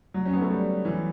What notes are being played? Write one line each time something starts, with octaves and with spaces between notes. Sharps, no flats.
F#3
C#4
B3
A3
G3
E3